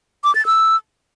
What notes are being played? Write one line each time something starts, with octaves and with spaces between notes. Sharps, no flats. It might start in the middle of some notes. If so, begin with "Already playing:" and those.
D6
A6
E6